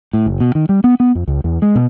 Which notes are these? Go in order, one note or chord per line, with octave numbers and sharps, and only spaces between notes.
A2
F#1
B2
D#3
G3
B3
B3
F2
C#2
E2
G#3
B2